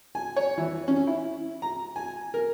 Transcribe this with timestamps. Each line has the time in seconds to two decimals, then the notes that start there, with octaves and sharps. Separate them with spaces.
0.15 G#5
0.37 C#5
0.58 E3
0.88 C#4
1.07 E4
1.62 A#5
1.96 G#5
2.34 A#4